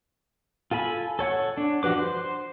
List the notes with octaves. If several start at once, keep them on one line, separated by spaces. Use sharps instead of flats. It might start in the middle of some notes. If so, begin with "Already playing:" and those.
F4 A4 G#5 B5
A4 C#5 F#5
D4
F3 F#4 G4 B4 D6
C5